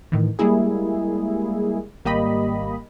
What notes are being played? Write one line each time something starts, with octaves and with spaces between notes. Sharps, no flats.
A2 D#3 E3
G3 G#3 A#3 E4 G#4
G#1 G3 A#3 G4 D#5 B5